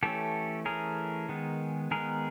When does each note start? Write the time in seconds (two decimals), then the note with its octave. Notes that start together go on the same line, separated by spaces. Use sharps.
0.03 E3 A3 C#4 G4 A4
0.65 E3 A3 C#4 G#4 A#4
1.29 D#3 G#3 B3
1.91 D#3 G#3 B3 G#4 A#4